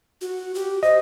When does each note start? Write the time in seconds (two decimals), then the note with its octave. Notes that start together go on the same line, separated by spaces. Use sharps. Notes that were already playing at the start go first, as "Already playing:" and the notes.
0.21 F#4
0.55 G4
0.83 C5 D#5